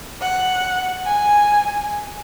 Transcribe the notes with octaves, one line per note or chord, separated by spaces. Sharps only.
F#5
G#5